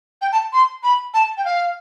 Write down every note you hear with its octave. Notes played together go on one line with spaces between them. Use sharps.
G5
A5
C6
B5
A5
G5
F5